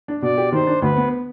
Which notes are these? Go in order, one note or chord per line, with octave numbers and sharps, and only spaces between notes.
D4
B2 D5
G4
D#3 C5
D4
D2 B4
B3